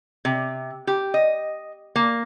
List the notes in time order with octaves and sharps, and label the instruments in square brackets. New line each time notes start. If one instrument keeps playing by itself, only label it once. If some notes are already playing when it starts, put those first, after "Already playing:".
[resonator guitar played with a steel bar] C3
G4
D#5
A#3